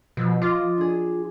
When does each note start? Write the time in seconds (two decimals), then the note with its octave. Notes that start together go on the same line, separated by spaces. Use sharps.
0.17 B2 F3 E6 C7
0.42 F4 D#5 D6 F#6
0.77 D4 G#4